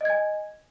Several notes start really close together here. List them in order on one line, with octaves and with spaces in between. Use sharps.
D#5 G#6 G#5